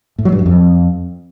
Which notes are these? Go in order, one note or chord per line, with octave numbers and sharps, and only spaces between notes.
A2
F#3
G2
F#2
F2